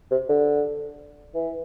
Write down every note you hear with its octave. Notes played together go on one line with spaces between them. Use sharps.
C3
D3
E3